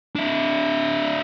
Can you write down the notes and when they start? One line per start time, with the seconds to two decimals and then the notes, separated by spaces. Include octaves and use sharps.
0.16 D4 E4